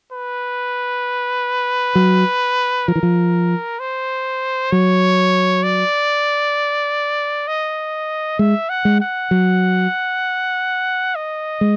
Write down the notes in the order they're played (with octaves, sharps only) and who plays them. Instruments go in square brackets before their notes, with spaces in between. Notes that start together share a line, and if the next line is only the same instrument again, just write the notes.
[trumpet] B4
[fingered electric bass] F#3
[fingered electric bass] F3 [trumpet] A#4
[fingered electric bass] E3
F3
[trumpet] C5
[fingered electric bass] F#3 [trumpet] C#5
[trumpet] D5
D#5
[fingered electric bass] G#3 [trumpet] E5
[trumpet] F#5
[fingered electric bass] G#3
[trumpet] F#5
[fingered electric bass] F#3
[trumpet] D#5
[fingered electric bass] G#3